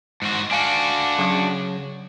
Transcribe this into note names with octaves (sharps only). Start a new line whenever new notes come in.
G#2 F#4
D4 F#4 F5 G#5
C#3 F#3 C#5